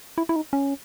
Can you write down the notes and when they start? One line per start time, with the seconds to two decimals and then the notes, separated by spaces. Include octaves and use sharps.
0.18 E4
0.29 E4
0.36 D#4
0.53 C#4